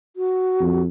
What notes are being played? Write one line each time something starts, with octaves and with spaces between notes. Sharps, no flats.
F#4
F2